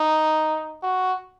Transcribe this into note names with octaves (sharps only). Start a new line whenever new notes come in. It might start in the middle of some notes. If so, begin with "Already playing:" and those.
Already playing: D#4
F#4